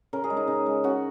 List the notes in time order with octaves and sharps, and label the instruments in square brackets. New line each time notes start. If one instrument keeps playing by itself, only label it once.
[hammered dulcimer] C#3 A#4
G#4
G#3
D#4
C#3 D#4
G#3
C#3 F#4